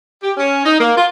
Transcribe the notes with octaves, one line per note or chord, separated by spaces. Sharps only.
G4
C#4
D#4
A#3
F4